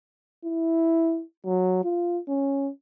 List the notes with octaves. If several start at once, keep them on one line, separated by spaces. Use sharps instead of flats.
E4
F#3
F4
C#4